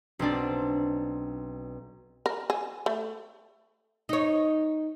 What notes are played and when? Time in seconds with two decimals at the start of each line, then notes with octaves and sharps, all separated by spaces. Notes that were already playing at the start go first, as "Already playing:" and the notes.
0.19 B1 C4 D4 D5
2.26 A#4
2.50 G#4
2.86 A3
4.09 D#4 C#5